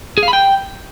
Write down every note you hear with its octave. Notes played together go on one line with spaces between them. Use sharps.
G#4
F5
B5
G5